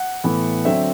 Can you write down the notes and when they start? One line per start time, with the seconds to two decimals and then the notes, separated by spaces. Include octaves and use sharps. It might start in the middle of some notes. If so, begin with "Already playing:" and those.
Already playing: F#5
0.24 A2 E3 B3
0.65 D3 F#3 C4 E5